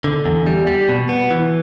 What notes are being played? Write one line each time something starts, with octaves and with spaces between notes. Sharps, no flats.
D3
E2
G3
G3
B2
B3
E3